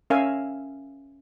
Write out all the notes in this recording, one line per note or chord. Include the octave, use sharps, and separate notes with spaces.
C#4 A#4 E5 F5 G#5